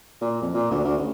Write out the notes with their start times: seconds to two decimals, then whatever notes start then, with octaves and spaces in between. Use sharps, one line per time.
0.21 A#2
0.42 F2
0.54 A#2
0.71 D2
0.84 D2
0.98 A1